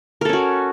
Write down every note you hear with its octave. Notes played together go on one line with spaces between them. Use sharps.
C#4 F#4 A4 A#4